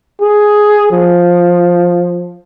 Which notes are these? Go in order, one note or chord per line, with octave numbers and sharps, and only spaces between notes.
G#4
F3